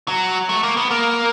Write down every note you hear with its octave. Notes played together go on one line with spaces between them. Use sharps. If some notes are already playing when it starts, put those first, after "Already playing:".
F#3
A3
A#3
B3
A#3